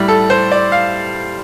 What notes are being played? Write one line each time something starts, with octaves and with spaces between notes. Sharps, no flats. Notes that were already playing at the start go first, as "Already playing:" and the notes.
Already playing: A2 G3
A4
C5
D5
F5